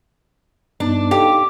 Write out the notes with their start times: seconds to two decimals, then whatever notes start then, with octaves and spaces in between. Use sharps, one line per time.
0.80 G2 B3 D4 D#4
1.11 D#4 G4 A4 F5